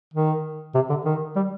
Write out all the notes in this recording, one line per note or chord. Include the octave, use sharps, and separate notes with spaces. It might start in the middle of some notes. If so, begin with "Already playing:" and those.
D#3
C3
D3
D#3
G3